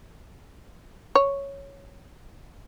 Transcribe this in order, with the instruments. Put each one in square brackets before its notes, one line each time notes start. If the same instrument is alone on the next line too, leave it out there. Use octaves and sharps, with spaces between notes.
[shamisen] C#5